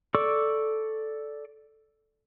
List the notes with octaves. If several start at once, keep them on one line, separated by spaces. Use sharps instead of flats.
A4 D5 C#6 D6 E6